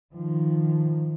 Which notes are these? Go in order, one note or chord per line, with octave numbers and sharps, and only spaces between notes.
D#3 F3